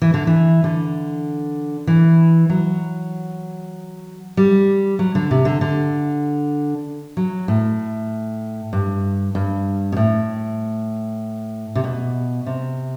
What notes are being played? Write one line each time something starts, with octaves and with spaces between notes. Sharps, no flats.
E3
D3
E3
D3
E3
F#3
G3
F#3
D3
C3
D3
D3
F#3
A2
G2
G2
B2
A2
C3
B2
C3